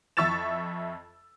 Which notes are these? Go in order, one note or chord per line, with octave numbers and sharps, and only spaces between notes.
F2 E5 C#6 E6 A6 E7